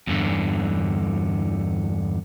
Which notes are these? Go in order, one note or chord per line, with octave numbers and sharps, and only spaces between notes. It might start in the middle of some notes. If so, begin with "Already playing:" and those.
E2 G2 D3